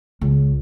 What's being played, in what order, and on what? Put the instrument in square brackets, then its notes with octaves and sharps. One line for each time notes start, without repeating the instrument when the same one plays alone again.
[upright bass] C#2